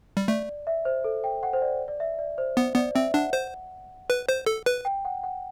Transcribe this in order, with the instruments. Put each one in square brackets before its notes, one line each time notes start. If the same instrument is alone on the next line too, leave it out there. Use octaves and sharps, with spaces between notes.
[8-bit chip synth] G3
[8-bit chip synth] A3 [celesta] D5
[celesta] E5
C5
A4
G5
F#5
C5
D5
D5
E5
D5
C5
[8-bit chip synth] B3 [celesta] C5
[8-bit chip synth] B3 [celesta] D5
[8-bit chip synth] C4 [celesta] E5
[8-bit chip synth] D4 [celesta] F#5
[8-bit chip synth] C5
B4
C5
A4
B4
[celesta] G5
F#5
F#5